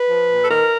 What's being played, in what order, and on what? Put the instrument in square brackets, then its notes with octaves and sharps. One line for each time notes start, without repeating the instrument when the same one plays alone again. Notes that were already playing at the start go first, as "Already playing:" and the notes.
Already playing: [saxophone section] B4
F3
A#2
A4
D#3 A#4